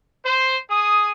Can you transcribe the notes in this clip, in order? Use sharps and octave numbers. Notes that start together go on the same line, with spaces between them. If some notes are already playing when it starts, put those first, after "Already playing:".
C5
G#4 D#6